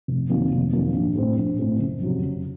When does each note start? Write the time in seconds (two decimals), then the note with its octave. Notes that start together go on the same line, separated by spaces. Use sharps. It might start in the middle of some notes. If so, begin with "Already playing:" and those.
0.08 F1
0.29 F2 D#3 F#3 A#3
0.51 F1
0.72 F2 D#3 F#3 A#3
0.94 A#1
1.15 A2 A3 C4
1.37 A#1
1.58 A2 A3 C4
1.80 F#1
2.00 F2 C3 F#3
2.23 F#1